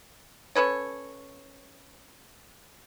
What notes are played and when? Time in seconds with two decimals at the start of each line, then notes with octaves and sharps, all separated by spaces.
0.56 C#4 A4 B4 C#5